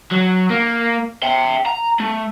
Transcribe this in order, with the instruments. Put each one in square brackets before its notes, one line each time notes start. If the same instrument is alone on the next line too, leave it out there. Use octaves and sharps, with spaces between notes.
[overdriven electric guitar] F#3
A#3
E5 G5
A#5
A3